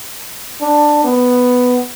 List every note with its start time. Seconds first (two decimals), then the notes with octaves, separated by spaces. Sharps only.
0.61 D4
1.04 B3